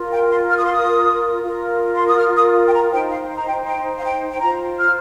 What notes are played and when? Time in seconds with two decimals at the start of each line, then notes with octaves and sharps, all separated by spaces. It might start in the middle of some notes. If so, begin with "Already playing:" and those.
Already playing: F4 A#4
0.12 G5
0.30 C6
0.50 F6
0.57 D#6
0.64 C6
0.73 D#6
1.43 F4 A#4
1.95 C6
2.07 D#6
2.18 F6
2.36 D#6
2.67 G5
2.74 A#5
2.92 C5 G5
2.95 D#4
3.10 F5
3.36 A#5
3.48 G5
3.66 G5
3.99 F5
4.04 G5
4.31 G5
4.41 F4 C5 A#5
4.79 F6